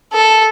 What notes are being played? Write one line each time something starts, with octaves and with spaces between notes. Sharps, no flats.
A4